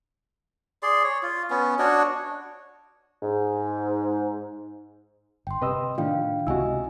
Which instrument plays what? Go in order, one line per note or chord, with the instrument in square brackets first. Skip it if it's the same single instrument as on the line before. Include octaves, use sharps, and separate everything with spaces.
[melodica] G#4 D5 C6
C#5
F4
B3 C#4
D4 F#4 C#5 D#5
[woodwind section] G#2
[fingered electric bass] G1 [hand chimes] G5 C6
[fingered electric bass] C3 [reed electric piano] B4 D#5 E6
[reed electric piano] A2 D#3 D4 [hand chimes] F4 F5 G5
[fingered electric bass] C#2 C3 [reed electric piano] E4 F#4 [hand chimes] D#5 G#5 E6